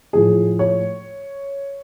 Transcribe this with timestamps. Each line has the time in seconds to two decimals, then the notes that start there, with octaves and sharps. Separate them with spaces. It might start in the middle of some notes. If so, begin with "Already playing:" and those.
0.13 A2 F3 A3 G#4
0.59 C#5